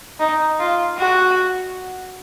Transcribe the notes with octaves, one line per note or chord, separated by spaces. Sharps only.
D#4
F4
F#4